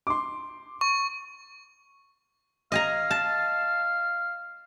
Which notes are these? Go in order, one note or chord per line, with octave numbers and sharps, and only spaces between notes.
C6 D6
C#6
D#5 F5 G#5 A#5
A5